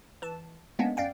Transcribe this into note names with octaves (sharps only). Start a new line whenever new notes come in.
E3 A5
G#3 A#3 B3 C#4 D4
F#2 D5 F5 G5